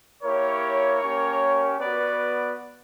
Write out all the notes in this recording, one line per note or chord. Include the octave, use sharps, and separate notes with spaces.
A#3 E4 G4 A#4 C#5
A#3 C#4 G4
B3 F#4 B4 D5